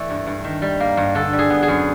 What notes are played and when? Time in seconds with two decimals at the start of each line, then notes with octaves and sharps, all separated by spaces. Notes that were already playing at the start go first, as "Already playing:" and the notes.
Already playing: E3 A3 D5
0.10 G2
0.27 G2
0.44 D#3
0.62 G3
0.80 A#3
0.97 G2
1.15 D3 A4
1.33 G3
1.39 G#4
1.50 B3
1.63 G#4
1.68 F#2